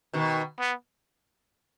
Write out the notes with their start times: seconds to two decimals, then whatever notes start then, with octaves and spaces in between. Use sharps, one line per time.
0.13 B2 D#3
0.59 B3